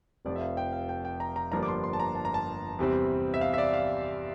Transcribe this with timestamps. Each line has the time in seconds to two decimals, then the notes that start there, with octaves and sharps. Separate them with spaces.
0.25 F1 F2 C3 F3 D5
0.36 E5
0.41 F5
0.57 G5
0.73 F5
0.89 G5
1.05 G5
1.20 A#5
1.36 A#5
1.52 G1 G2 F3 A#3 D4 A#5
1.63 D6
1.68 C6
1.84 C6
1.93 A5
2.00 A#5
2.15 A5
2.25 A#5
2.34 A5
2.79 E2 C3 G3 C4
3.34 E5
3.41 F5
3.54 E5
3.58 D5
3.74 F5